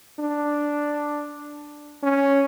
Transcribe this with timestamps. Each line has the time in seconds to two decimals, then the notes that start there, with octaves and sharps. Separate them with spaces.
0.19 D4
2.03 C#4